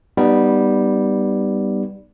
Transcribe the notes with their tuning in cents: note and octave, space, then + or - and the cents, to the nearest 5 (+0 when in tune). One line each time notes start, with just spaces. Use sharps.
G3 +0 B3 +0 D#4 -25